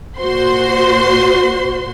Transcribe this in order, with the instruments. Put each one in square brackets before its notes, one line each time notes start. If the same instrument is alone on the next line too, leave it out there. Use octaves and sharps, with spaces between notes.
[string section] A#2 F#4 C5 C6